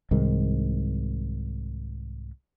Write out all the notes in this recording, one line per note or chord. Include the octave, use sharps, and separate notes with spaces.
C2 G#2 D#3